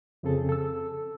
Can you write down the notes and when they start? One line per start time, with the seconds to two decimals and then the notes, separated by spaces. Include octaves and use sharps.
0.23 F2 C#3 C4 G#4 A4
0.49 A4 E6